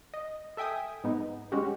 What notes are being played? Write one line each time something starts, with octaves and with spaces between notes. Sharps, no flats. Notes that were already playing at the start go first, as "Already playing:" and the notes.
D#5
A4 E5 G5 G#5 D#6
G#2 B3 D#4
G#3 C#4 F#4 G4